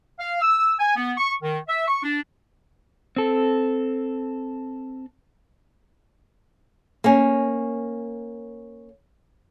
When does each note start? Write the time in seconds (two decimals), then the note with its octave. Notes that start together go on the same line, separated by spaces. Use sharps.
0.20 F5
0.41 E6
0.79 G#5
0.95 B3
1.17 C#6
1.42 D#3
1.68 E5
1.87 C#6
2.03 D4
3.16 C4 A4
7.04 A#3 C#4